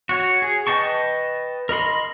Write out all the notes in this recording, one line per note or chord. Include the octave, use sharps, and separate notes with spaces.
F#4 C#5
G#4
B4 D#5 G5 A5 C#6
A#4 D#5 B5 C6